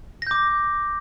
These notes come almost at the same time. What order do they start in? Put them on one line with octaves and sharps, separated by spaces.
A#6 G6 D6